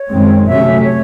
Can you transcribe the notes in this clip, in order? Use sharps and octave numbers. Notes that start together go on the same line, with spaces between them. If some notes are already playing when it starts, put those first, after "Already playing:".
Already playing: C#5
F#2 D#3 G#3 C4
C3 F#3 A3 C#4 E5
C#5